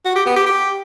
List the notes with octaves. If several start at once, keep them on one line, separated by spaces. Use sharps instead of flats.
F#4
G4
B3
G4
G4